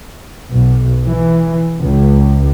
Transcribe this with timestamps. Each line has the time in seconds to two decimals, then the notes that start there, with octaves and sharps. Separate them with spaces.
0.52 B1
1.06 E3
1.81 C#2